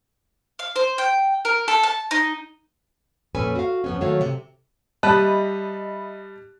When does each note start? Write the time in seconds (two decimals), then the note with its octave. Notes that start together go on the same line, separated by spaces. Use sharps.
0.59 F5
0.76 C5
0.98 G5
1.45 A#4
1.68 A4
1.83 A5
2.11 D#4
3.35 F2 A#2 C#4 A4 B4 G#5
3.55 F#4 F5
3.84 F2 B3 C#4
4.01 D#3 F#3 A3 F#4 C#5 F5
4.21 C3
5.03 G3 D#5 E5 A5 B5 F#6